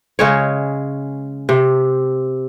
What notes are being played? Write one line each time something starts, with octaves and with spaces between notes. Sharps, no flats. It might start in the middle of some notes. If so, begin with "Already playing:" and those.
C#3 G#3 C#5
C3